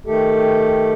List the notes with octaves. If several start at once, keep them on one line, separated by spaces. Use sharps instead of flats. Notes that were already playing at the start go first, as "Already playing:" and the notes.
D#3 A3 G4 A4